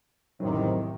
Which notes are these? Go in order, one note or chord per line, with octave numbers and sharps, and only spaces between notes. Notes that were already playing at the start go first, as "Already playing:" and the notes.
A1 A2 C3 D#3 F#3